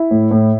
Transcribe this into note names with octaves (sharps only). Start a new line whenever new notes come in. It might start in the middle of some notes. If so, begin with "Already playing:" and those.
Already playing: E4
A2
A2